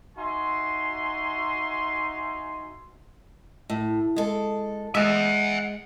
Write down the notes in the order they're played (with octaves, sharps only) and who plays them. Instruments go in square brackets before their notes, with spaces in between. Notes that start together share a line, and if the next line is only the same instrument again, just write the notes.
[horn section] D#4 F#4 E5 G#5 C6
[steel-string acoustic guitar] A2
G#3 A4
[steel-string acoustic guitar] G#3 [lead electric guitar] E5 F#5